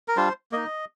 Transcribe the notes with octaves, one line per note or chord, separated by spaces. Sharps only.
A#4
G3 D4 F4 C5
A#3 D#4 D#5